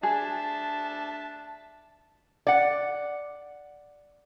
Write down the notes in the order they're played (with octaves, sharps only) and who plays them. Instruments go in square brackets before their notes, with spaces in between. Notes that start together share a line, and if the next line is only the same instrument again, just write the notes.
[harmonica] D4 E5 [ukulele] G#4 [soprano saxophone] A5
[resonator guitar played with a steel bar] D5 F#5